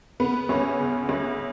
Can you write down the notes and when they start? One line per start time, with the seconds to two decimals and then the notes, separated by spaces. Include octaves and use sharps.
0.20 C#3 B3 B4
0.49 D2 C#4 C#5
0.79 C#3
1.09 D2